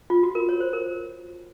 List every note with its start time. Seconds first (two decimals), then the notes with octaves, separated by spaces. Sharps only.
0.10 F4
0.23 F#4
0.35 A#4
0.49 C#5
0.60 C5
0.73 A#4